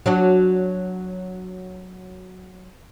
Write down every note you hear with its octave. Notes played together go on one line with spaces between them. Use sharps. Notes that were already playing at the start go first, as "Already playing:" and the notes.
F#3 D4 F#4